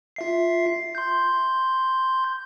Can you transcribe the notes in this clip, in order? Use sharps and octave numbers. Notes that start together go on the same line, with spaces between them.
F4 E5 C7
C6 G6